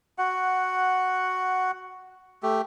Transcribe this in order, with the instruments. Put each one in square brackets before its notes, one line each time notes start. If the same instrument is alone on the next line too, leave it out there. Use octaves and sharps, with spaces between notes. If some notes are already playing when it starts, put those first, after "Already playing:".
[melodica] F#4 F#5
A3 G4